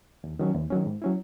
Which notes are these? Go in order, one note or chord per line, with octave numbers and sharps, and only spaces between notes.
D#2
D#3 F#3 C#4
D#2
D#3 F#3 C#4
G#2
F#3 C#4 E4